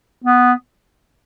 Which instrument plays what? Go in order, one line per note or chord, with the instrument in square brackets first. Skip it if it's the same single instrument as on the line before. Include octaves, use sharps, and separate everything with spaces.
[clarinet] B3